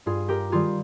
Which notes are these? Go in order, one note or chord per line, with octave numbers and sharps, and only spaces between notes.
G2 F4 G#4
G4 A#4
D#3 G3 F4 G#4